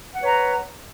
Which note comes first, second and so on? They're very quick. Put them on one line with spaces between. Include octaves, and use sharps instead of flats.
F#5 B4 C#5 A#5